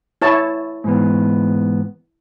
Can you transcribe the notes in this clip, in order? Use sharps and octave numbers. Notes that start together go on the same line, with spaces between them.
E4 C#5 A5
G#2 E3 B3